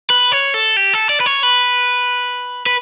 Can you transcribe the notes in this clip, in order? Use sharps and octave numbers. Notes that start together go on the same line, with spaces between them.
B4
C#5
A4
G4
A4
D5
B4
C#5
B4
B4